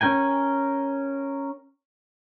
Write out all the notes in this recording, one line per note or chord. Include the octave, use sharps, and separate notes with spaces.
C#4 A#4 G5 G#5